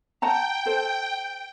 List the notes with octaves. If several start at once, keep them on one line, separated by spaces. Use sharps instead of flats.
F#5 G5 A5 A#5
A4 C5